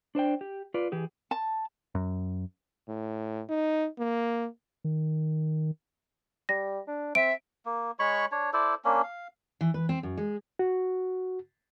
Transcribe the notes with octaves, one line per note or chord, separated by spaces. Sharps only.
D4 C5 D5 G5
G4
F4 B4 D5
E3 G4 G#4
A5
F#2
A2
D#4
A#3
D#3
G3 A#6
D4
C4 E5 D7
A#3
G#3 C#5 B5 C#6
D4 C#5
E4 A4 C5 D5
A#3 C#4 D4
F5
E3
B4
C4
F#2
G#3
F#4